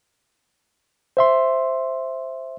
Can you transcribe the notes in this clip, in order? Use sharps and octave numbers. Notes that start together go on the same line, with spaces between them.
C5 E5 C6